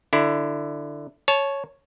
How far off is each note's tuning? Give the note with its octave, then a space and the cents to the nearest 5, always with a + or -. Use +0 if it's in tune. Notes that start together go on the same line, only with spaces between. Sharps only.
D3 +10 E4 +15
C#5 +0 A5 -25